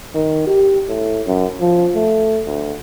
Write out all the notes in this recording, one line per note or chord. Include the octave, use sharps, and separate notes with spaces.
D#3
G4
A2
F#2
F3
A3
D2